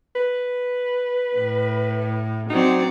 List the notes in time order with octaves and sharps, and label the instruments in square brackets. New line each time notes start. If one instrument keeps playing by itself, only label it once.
[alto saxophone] B4
[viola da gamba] A2
[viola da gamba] F#3 C4 D5 [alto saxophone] D#4